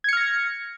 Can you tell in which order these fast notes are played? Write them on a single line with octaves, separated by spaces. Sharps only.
G#6 C#7 F6 A#6